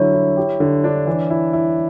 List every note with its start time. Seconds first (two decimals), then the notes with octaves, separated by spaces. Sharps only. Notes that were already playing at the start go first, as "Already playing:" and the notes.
Already playing: D3 F#3 E4 C#5
0.14 E4
0.37 G4
0.60 D3
0.84 D4
1.07 E3
1.30 E4
1.53 E4